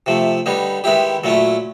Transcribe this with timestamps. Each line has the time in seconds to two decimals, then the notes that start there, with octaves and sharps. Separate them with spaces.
0.06 C3 F3 A3
0.46 D3 G3 B3 D#4
0.84 D#3 G#3 B3 E4 G4
1.24 A#2 F#3 A3 C#4 E4